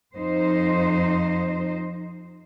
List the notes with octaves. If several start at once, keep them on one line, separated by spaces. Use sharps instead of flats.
F2 D#4 C5